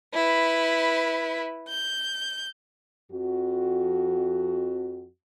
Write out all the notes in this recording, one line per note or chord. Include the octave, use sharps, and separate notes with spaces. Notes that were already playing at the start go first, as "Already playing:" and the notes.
E4 B4
G6
F2 F#4